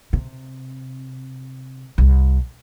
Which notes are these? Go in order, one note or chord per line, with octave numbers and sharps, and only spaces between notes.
C3
C2